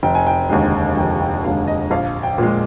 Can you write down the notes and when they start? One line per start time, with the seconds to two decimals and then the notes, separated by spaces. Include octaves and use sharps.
0.03 F1 G5
0.15 G#5
0.27 G5
0.49 D#2 D3 G#3 G5
0.97 F1 G5
1.20 G5
1.44 D#2 D3 G#3 F5
1.67 D#5
1.91 A#1 F5
2.23 G5
2.38 A#2 G#3